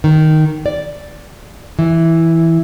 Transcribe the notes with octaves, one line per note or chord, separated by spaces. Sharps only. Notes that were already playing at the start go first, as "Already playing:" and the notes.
D#3
D5
E3